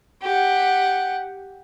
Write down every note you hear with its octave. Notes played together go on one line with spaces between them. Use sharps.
G4 F#5